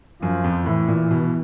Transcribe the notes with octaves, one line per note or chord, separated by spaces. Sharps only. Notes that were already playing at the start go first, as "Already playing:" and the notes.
F#2 F3
F2
A2 E3
A#2
B2